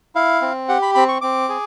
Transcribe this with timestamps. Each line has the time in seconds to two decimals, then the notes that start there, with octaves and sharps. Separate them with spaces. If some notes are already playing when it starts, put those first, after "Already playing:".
0.16 E4 F5
0.42 C4
0.69 G4 F#5
0.82 B5
0.95 C4 B5
1.08 C#6
1.21 C4 D6
1.49 G#4